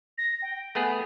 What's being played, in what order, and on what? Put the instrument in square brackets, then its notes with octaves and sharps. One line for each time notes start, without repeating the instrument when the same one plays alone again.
[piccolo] A#6
G5
[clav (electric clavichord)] A3 B3 G#4